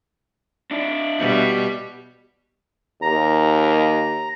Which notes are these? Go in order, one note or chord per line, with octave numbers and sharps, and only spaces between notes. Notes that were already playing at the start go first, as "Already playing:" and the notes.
D4 E4
B2 G3
D#2 A#5